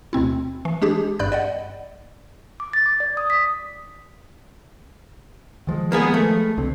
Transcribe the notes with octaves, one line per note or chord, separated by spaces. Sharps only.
D2 B2 C4 E4
E3
G#3 D4 G4 G#4
G#1 G2 D5 B5 F#6 G6
D5 D#5 F#5
D6
A6
D6
D5
D#6
B6
D#3 F3 G#3
A#3 B3 G#4
A3
C2 D3 C4